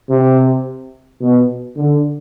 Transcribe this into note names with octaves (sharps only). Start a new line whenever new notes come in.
C3
B2
D3